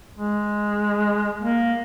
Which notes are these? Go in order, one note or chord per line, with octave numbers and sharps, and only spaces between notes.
G#3
A#3